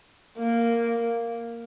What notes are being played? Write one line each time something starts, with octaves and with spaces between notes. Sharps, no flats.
A#3